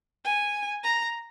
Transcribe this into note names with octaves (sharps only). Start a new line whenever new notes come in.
G#5
A#5